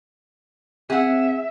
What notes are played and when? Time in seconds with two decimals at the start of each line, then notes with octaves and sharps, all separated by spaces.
0.90 C4 G#4 E5 F#5